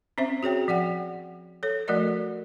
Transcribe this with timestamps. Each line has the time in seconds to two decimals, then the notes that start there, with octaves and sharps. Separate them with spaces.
0.18 C4 C#4 C5 E5
0.43 F#4 G#4 C#5 G5
0.68 F3 D5 F#5 G5
1.63 A4 C#5
1.88 F3 A3 F#4 A#4 D5 D#5